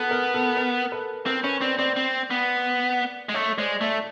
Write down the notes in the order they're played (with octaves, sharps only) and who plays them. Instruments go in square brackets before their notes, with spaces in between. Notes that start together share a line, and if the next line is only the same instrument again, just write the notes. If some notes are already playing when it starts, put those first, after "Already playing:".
Already playing: [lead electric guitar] B3 [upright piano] A4 B4
[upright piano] A#4
A4
A#4
A4 B4
[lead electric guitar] C4 [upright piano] A#4 C5
[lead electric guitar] C#4 [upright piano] B4 C#5
[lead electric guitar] C4 [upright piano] C5 D5
[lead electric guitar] C4 [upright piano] C5 D5
[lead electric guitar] C4
B3
G#3
[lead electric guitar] A3 [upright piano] C#5 D#5
[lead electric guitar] G#3 [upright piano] C5 D5
[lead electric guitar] A3 [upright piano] D5 E5